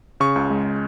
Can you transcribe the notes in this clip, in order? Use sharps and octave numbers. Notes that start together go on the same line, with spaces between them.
C#3 C#6
C#2
G#3